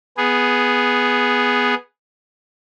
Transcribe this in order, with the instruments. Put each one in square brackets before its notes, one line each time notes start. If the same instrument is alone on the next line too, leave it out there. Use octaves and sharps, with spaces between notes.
[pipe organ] B3 G#4